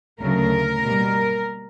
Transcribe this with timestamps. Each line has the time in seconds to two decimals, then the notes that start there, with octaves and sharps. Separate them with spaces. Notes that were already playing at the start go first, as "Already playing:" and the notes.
0.20 D2 C#3 F#3 A3 A#4
0.83 B2 G3 A#3